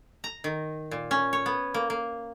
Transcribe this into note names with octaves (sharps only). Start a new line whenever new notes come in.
A#5
D#3
A#2
C#4
C#5
B3
A#3
A#3